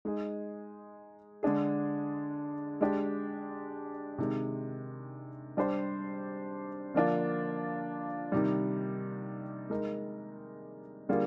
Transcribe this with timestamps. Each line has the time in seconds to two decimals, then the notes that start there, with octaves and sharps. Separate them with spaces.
0.05 G#3 D#4 G#4
1.43 D3 G#3 D4 G#4
2.81 G#3 D4 G4
4.18 C3 D#3 G#3
5.57 G3 D4 G4 C5
6.94 D3 F3 A#3 D4 F4
8.32 C3 D#3 G3
9.70 G#3 D#4 A#4
11.09 D3 G3 A#3 F4 G#4